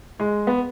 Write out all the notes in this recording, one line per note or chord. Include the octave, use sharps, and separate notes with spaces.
G#3
B3